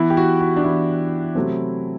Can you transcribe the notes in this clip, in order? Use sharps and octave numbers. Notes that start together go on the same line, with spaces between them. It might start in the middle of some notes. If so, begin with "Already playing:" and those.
Already playing: E3 B3 E4
G4
F#4
F#4
D4
E3 B3 E4
C3 F#3 A3 C4